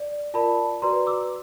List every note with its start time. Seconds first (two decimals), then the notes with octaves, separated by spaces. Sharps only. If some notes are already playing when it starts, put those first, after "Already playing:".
Already playing: D5
0.34 F4 A#4 D5 A5 B5
0.82 F#4 B4 D5 A#5 C6
1.07 D6 E6